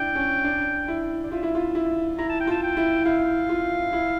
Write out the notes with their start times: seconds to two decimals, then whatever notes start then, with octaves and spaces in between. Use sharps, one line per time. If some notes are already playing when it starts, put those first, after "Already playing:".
Already playing: D4 E4 G5
0.15 C#4
0.44 D4
0.88 E4
1.23 D5
1.31 F4 E5
1.43 E4
1.55 F4
1.75 E4
2.19 E4 A#5
2.29 A5
2.40 G5
2.47 F4 A5
2.63 G5
2.77 E4
3.05 E4 F5
3.49 F4
3.93 E4